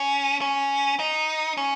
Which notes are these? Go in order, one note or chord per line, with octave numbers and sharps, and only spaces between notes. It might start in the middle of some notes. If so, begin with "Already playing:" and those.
Already playing: C#4
C#4
D#4
C#4